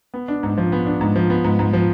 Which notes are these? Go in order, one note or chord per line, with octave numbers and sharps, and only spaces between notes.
B3
D4
G#2
F3
B3
D4
G#2
F3
B3
G#2
G#2
F3